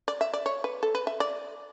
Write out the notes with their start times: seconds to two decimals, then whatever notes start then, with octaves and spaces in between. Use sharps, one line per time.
0.08 D5
0.21 E5
0.33 D5
0.46 C#5
0.64 B4
0.83 A4
0.95 B4
1.07 E5
1.20 D5